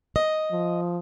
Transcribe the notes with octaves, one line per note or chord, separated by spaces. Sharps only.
D#5
F3